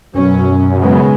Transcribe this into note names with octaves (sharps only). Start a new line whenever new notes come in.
F#2 B2 F#3 C#4
C#3 G#3 B3